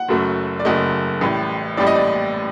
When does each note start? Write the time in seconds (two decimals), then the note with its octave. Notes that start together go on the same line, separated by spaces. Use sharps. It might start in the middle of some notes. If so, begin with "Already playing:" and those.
Already playing: F#5
0.09 F#1 F#2 F#3 A3
0.59 D5
0.65 F#1 F#2 F#3 A3 D#5
1.21 A1 A2 G3
1.77 A1 A2 G3 D5
1.87 D#5
1.95 D5